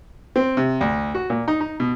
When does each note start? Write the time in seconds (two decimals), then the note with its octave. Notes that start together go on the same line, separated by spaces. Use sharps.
0.36 C4
0.57 C3
0.81 D2
1.15 F#4
1.30 A#2
1.48 D#4
1.61 D#4
1.80 B2